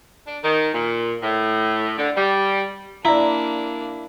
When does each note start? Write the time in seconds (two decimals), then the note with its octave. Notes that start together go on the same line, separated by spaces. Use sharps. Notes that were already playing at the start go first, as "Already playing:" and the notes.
0.27 D4
0.44 D#3
0.74 A#2
1.23 A2
1.98 D3
2.17 G3
3.05 A#3 D4 E4 D5 A#5